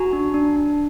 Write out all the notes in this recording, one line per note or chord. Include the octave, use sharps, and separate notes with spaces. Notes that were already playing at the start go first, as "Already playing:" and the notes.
Already playing: F#4 G#5 A#5
D4
D4
D4